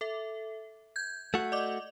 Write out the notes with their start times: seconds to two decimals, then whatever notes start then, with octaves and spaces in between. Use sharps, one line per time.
0.01 A4 E5
0.96 G6 G#6
1.34 A3 F#4
1.52 D5 D#5 D6